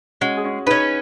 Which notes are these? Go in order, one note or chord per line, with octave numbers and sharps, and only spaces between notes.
G#3 C#4 F#4
G#4
C#4 F#4
C#4 D#4 G#4 B4